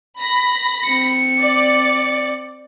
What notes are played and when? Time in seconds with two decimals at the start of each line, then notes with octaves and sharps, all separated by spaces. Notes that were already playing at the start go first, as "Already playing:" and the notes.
0.20 B5 A#6
0.85 C4 C#7
1.41 D5